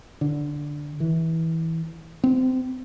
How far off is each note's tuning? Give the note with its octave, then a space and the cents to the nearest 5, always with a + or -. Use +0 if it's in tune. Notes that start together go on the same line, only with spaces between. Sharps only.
D3 +0
E3 -20
C4 -25